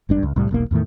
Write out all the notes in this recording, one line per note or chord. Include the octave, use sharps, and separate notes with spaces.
G#1 G2 D4
C#2
C2 A2 G3
E1 B1 A#3
E2 A2 D#3 A3